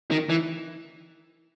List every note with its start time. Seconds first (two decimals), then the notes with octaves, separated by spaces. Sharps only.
0.11 D#3
0.30 E3